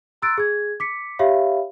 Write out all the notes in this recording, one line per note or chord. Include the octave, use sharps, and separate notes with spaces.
A#5 C6 E6 F#6 A6 D7
G#4 G#6
D6 B6 C#7
G4 C#5 E5 F5 B5